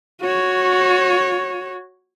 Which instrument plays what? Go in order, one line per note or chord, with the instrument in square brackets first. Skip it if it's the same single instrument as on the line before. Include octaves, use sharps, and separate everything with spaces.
[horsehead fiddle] F#4 C#5